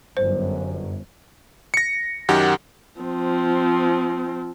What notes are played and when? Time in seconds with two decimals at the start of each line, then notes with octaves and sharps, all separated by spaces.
0.17 G1 F#2 C5
1.74 A#6 C#7
2.29 F#2 D#3 G4 F#5
3.00 F3 C4